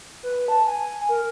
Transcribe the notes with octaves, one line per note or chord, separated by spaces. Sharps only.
B4
A5
G#5
A#4